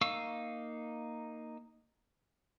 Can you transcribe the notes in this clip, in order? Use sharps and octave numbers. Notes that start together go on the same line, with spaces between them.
A#3 D#4 F5 C#6 E6